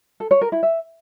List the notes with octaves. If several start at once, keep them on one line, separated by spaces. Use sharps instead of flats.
A4
C#5
A#4
E4
E5